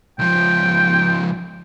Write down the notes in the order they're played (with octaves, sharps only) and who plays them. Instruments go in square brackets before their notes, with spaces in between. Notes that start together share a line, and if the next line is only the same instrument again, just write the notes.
[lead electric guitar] C#2 F3 [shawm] G5